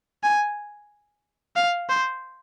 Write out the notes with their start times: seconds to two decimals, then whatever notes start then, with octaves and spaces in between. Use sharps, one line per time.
0.23 G#5
1.56 F5
1.89 C5